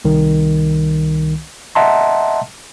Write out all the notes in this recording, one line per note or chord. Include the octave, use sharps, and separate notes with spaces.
C2 D#3
D#5 E5 F#5 A5 A#5 C6